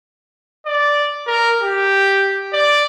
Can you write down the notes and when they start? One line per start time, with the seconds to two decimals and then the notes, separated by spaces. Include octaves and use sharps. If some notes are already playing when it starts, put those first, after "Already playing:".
0.66 D5
1.27 A#4
1.62 G4
2.53 D5